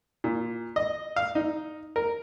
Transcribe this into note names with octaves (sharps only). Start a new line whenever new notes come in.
A#2
D#5
F5
D#4
A#4